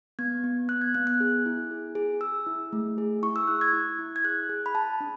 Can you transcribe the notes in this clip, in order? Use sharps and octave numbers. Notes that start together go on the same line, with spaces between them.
B3 G#6
B3
B3 F#6
G#6
B3 F#6
F#6
G#4
E4
G#4
G#4
G#4 E6
E4
A3
G#4
E4 C#6
E6
E4 F#6
G#6
E4
E4
G#6
G#4 F#6
G#4
B5
G#4 A5
D4